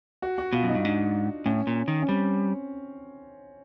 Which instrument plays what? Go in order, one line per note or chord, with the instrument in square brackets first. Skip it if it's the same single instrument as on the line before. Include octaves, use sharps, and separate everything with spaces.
[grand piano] F#4
F#4
[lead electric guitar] B2 [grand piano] F4
[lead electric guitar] F#2
[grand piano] D#4
[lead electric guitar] G2
[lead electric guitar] G#2 [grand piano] D4
[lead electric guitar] A2 [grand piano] C#4
[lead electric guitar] A#2
D#3
[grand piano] C#4
[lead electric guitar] G3 [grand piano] C4